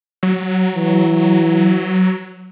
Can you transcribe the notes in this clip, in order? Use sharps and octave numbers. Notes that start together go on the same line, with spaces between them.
F#3
E3